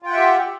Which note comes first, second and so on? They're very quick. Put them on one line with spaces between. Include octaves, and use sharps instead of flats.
F4 G5 F#5 E5 G4